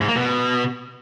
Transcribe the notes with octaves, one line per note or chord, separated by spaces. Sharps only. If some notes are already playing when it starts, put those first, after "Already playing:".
G#2
A#3
B2